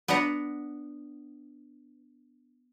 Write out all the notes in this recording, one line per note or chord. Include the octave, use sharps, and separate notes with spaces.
B3 D4 B4 F#5 A#5